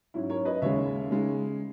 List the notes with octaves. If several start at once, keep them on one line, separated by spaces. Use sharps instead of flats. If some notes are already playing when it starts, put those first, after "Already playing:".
G#2 F#3 C#4 E4
A#4 C#5
B4 D#5
D#2 C#3 G#3 C#5 E5
C#3 G#3 D#4